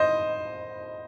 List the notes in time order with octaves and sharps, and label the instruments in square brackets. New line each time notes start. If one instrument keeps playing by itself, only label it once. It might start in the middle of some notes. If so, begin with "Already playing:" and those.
Already playing: [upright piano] C5 D#5